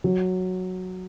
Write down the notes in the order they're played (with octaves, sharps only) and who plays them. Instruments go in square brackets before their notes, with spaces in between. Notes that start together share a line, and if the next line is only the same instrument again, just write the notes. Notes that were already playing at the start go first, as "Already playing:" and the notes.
[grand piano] F#3